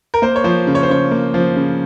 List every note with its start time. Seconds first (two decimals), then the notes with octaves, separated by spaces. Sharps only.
0.14 A#4
0.22 A#3 C5
0.36 C#5
0.44 F3 C5
0.67 C#3
0.75 C#5
0.83 C5
0.89 C#3 C#5
1.11 A#3
1.34 F3
1.56 C#3